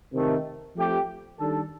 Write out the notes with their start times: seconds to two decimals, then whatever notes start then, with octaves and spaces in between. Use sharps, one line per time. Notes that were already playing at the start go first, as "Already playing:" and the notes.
0.12 C3 D#3 A3
0.75 F3 A3 C4 G4
1.39 D#3 G3 D4 A4